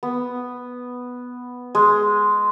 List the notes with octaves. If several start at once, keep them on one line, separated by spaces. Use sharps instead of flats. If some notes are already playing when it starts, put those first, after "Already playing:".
B3
G#3